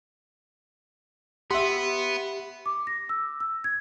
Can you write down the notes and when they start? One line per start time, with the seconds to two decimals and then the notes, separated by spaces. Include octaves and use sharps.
1.51 B3 G4 E5 C6
2.66 D6
2.87 A#6
3.09 E6
3.40 E6
3.64 G#6